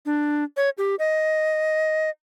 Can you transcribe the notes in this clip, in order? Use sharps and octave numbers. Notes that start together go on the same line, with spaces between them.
D4
C#5
G4
D#5